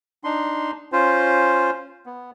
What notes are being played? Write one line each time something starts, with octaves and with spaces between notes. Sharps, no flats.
D4 D#4 C6
C#4 F4 C5
B3